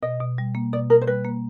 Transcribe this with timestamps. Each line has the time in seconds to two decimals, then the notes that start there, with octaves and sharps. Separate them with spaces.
0.02 B2 D#5
0.21 B2
0.38 G3
0.55 A#3
0.73 B2 D5
0.90 B2 A#4
1.01 C5
1.07 G3 B4
1.25 A#3